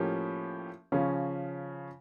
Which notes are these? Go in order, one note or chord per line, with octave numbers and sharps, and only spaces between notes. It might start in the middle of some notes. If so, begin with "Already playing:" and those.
Already playing: A2 F3 A#3 C#4 G4
C#3 F3 C#4